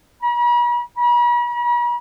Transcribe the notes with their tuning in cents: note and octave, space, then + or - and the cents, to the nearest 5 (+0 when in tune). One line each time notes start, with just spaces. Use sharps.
B5 -45
B5 -45